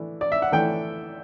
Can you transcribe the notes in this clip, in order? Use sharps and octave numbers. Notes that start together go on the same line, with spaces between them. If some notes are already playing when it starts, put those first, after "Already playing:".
Already playing: E3 A3 D4
D5
E5
F#5
E3 A3 D4 G5